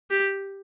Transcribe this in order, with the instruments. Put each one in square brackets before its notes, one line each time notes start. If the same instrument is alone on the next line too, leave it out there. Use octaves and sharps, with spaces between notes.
[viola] G4